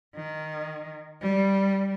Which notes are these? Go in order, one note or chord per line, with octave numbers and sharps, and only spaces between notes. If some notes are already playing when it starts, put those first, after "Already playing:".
D#3
G3